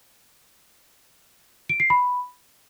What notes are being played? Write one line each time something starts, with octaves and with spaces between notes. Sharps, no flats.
D7
C7
B5